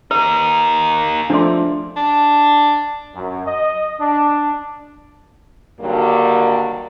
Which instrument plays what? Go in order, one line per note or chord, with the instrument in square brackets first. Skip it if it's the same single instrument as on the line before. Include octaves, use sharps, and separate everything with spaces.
[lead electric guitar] A#3 D#4 [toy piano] B4
[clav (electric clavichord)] F3 A3 D5 [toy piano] D4 C6
[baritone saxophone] D4
[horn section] F#2
D#5
D4
[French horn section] G2 D3 D#3 F#3 G3 A#3